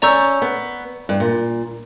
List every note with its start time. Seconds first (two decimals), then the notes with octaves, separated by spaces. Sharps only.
0.02 C#4 D5 A#5 C#6 E6 G6
0.42 B3
1.09 G2
1.20 A#2